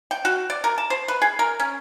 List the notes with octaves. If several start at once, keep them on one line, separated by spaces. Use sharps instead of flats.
G5
F#4
D5
A#4
A5
C5
B4
G#4
A#4
C#4